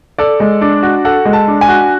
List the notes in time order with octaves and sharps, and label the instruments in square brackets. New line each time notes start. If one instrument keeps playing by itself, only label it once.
[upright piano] A4 [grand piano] D5
[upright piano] G#3
D4
F#4
[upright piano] A4 [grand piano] F#5
[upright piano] G#3
[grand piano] A5
[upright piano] D4
[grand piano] G#5
[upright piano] F#4